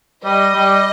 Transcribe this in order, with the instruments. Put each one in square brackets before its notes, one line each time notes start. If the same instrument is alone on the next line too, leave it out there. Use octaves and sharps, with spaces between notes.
[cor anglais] G3 [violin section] D#5
[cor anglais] G3